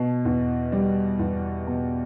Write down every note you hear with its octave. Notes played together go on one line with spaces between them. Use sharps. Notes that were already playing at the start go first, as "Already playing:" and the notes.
Already playing: B2
E2
G3
E2
B2